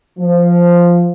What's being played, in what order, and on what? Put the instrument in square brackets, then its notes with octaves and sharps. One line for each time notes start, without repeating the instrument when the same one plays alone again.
[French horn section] F3